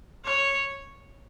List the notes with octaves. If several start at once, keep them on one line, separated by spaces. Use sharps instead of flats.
C#5